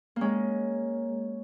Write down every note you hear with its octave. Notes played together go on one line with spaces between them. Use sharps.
G#3 A#3 C#4